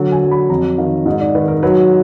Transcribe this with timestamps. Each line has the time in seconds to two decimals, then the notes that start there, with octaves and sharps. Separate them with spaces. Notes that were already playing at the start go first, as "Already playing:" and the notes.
Already playing: D3 F#3
0.12 G#5
0.22 F#3
0.31 B5
0.49 F2 A#5
0.78 D#3 F5
1.05 G#2 D#5
1.21 D5
1.35 D#3 B4
1.48 A#4
1.63 F#3 B4